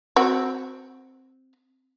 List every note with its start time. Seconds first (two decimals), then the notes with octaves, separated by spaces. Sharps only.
0.16 C4 F#4